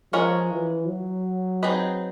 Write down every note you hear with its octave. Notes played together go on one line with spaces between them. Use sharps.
F3 G#3 C#4 F4 A#4 C#5
E3
F#3
C4 D#4 G#4 B4 D#5